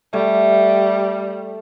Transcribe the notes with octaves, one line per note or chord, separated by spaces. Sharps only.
G3 A3